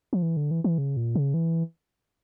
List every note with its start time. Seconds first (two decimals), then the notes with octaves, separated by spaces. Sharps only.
0.13 F3
0.22 E3
0.37 D3
0.51 E3
0.64 E3
0.78 C#3
0.97 A#2
1.15 C#3
1.34 E3